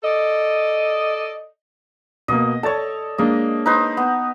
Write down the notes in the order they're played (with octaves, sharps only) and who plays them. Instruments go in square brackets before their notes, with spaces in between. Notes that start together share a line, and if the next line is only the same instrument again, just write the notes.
[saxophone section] A4 D5 D#5
[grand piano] B2 A#3 [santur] D#5
[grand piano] A4 D5 A6 [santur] C#5 A5
[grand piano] G#3 A#3 D4 [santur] D#5
[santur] D#4 B4 C5
B3